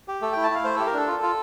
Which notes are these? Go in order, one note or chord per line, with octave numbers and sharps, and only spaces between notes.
G4
A3 A4
E4 G5
A5
E4 F5
A3 C5
G4 A4
A#4
D4 A4
F4
F4